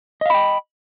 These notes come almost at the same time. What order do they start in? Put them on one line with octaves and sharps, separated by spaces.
D#5 F5 B5 G5